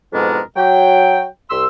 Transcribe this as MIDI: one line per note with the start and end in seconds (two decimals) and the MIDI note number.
0.12 0.39 41
0.12 0.39 44
0.12 0.39 47
0.12 0.39 56
0.12 0.39 62
0.12 0.39 70
0.55 1.24 54
0.55 1.24 79
1.49 1.65 36
1.49 1.65 84
1.49 1.65 88